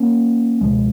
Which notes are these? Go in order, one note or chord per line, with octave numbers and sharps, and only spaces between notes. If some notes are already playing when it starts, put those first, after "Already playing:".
Already playing: A#3 C#4
C#2 B2 F3 G#3